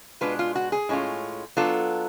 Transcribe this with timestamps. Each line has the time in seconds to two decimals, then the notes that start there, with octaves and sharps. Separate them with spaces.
0.21 B2 G#3 D4 F4 B4
0.39 F4
0.55 F#4
0.72 G#4
0.89 A2 G#3 C#4 F4
1.57 F#3 B3 D4 F4 A4